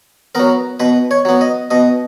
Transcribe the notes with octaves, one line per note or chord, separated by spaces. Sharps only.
F#3 B3 A#4
B2 B4
C#5
F#3 B3
D#5
B2 D#5